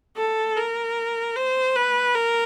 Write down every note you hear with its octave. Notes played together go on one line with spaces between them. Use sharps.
A4
A#4
C5
B4
A#4